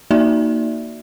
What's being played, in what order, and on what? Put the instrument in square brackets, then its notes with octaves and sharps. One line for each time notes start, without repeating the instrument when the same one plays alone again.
[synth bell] A#3 D#4 F#4 D5 E5